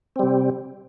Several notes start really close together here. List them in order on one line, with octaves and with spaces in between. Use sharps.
C4 G3 C3